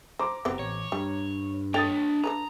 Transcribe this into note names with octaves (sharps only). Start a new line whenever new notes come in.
C5 A#5 D6
F#1 B3 C4 G4
A1 C#5
G2 G3
D4 A4 C#5 G5 D#6 A6 F7
D4 A4 B4 A#5